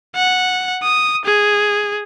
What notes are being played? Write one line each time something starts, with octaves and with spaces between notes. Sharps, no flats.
F#5
D#6
G#4